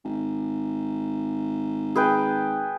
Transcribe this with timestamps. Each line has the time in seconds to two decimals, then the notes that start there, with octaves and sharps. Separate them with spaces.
0.05 G#1
1.96 G#4 B4 G5